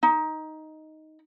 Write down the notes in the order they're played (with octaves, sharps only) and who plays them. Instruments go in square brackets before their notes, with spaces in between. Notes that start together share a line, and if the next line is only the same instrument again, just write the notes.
[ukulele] D#4